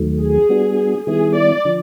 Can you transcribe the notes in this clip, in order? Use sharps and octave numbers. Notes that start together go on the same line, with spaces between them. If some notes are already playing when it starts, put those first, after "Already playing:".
Already playing: D#2 D#3 F#3 A3
G#4
G3 B3 D4 F#4
D#3 G3 B3 E4 G#4
D5
D3 F3